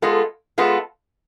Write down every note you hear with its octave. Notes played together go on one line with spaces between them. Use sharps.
G#3 B3 F4 A4
G#3 B3 F4 A4